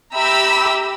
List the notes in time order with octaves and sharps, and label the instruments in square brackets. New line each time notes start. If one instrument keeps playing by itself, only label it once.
[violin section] G4 E5 A#5 B5 E6